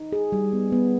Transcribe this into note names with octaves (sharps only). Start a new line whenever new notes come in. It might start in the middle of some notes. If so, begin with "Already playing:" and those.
Already playing: D#4
G#4
G3
B3
B3